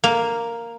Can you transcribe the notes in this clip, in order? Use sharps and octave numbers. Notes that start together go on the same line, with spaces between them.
A#3